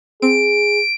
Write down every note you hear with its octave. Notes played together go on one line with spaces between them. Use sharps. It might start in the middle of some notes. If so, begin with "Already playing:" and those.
C4 G#4 D7